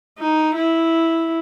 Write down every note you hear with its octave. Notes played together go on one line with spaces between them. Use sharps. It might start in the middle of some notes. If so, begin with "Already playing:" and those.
D#4
E4